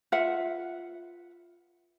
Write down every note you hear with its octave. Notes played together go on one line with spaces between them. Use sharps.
F4 B4 E5 F#5